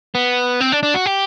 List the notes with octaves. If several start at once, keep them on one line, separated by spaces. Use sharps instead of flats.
B3
C4
D4
D4
F#4
G4